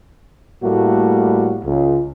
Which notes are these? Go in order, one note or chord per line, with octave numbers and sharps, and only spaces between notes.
A2 G3 A3 A#3 F#4
C#2